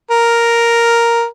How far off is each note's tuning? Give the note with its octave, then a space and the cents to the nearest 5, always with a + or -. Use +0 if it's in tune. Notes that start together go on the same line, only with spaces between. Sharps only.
A#4 +0